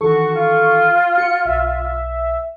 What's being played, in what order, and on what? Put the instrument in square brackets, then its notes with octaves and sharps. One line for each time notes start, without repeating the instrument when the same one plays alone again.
[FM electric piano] D#3 E3 A4 [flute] F#4 [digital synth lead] C#6
[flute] F4
[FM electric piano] F#4 [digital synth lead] C#7
[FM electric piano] B1 [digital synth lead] E5